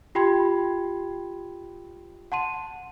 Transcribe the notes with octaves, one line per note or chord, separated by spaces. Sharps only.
F4 G4 G5 B5 C6 G#6
F#5 A5 C6 D#7